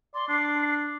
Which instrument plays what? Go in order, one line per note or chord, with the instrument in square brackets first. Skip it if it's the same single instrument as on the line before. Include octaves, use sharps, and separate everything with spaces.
[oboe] D5 [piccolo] C6
[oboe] D4 [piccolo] C7